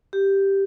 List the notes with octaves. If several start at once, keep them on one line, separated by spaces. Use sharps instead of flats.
G4